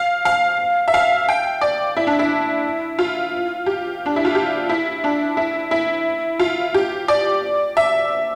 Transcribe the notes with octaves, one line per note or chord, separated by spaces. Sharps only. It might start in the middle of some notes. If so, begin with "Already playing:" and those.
Already playing: F5
F5
E5
F5
G5
D5
E4
D4
E4
F4
G4
D4
E4
F4
G4
E4
D4
E4
E4
F4
G4
D5
E5